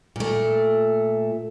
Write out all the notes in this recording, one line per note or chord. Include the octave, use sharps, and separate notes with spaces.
A#2 A3